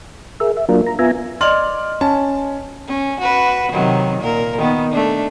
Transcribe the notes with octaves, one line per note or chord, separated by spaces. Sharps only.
G#4 A#4 E5
E5
F#3 A#3 D4 F4 A#4
A#5
B3 F4 E5 G#5 A#5
D5 D#5 C6 F6 F#7
C#4 A5
C#4
F#4 B4
C3 D#3 F#3
A#2 A#4
D#3 B3
A3 D4